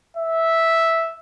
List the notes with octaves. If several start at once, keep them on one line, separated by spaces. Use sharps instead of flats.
E5